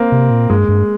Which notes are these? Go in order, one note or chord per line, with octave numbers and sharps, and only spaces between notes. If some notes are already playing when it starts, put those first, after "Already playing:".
Already playing: A#3 C4
C3
A#2
G2 G#3
G2